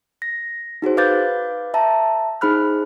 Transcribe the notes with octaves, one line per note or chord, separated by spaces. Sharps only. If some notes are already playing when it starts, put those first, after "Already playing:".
A#6
D#4 F#4 G#4 C5
B4 F5 D6 F#6 G6 A6
E5 A5 A#5
D#4 G#4 C5 B5 F6 F#6